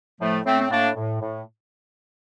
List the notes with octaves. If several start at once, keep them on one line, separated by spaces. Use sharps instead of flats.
A2 F3 A3
A2 A3 C4
C4
A2 A#3 D4
A2
A2